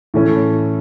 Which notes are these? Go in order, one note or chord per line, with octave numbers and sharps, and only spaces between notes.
A2 E3 A3 C#4